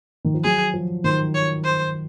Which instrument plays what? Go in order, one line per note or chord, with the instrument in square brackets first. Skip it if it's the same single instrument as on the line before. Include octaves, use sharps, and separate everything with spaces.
[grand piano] D#3
F3
[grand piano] F#3 [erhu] G#4
[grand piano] F3
[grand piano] D#3 [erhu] C5
[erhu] C#5
C5